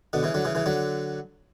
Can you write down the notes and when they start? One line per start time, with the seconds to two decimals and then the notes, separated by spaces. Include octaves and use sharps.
0.13 B2 D3
0.23 C#3 E3
0.34 D3 F#3
0.45 C#3 E3
0.55 C#3 E3
0.66 D3 F#3